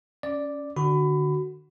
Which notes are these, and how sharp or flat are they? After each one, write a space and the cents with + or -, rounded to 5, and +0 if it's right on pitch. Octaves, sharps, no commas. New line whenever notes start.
C#4 +10 D5 +0
D3 +15 F#4 +5 B5 +25